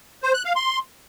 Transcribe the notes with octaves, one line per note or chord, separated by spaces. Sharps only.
C5
F#6
F5
C6